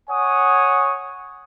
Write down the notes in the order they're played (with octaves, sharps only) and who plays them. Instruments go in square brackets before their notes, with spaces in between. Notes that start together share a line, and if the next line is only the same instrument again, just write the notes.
[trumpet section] C#5 F#5 G#5 D#6